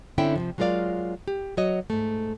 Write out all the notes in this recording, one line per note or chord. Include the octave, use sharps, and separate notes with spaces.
D3 C4 C#4 E4 E5 G5
C3 E3 F3
F#3 G#3 F4 A#4 D5 F5
G4
F#3 F#4 C#5 D#5
G#2 A3